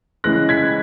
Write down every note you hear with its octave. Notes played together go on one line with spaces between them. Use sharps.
C#3 E3 G#3 F#6 A#6
G#6 B6